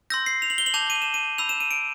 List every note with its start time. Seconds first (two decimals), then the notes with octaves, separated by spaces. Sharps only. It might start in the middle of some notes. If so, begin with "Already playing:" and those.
0.10 C6 E6 G6 A#6
0.26 C7
0.42 F7
0.50 F#7
0.58 G7
0.66 F#7
0.74 A5 D6 G6 F7
0.90 D#7
1.02 E7
1.14 D#7
1.38 B5 E6 G6 F7
1.49 E7
1.60 D#7
1.71 D7